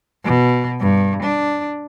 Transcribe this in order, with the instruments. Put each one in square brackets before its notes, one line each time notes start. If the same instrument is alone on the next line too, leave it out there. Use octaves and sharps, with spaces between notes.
[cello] B2
G2
D4